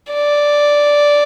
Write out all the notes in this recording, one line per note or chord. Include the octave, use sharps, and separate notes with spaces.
D5